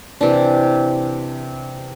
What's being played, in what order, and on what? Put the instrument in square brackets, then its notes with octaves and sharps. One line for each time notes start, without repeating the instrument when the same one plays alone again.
[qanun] C3 E3 D4